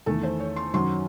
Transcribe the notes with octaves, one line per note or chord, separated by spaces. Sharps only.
E2 D#3 A3 A4
C5
C#5
C6
F#2 D#3 F#3 C6